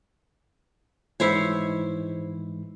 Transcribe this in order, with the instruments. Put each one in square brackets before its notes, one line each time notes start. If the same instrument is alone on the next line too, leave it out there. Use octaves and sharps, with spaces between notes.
[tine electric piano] G#2 E3 G#3 [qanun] E4 C5 C#5